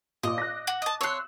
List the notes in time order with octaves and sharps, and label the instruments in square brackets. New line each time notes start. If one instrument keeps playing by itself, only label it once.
[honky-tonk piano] A#2 D6 [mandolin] D#5
[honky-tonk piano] F#6 A#6
[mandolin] F#4
D#5 A5
[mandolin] C#5 C6 [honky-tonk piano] E6 F#6